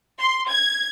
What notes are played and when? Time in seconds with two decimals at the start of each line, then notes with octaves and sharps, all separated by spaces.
0.18 C6
0.49 G#6